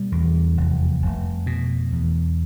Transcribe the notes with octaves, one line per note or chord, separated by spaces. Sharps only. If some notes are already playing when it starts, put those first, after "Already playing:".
Already playing: B2 G3
E2
F1
F1
B2
E2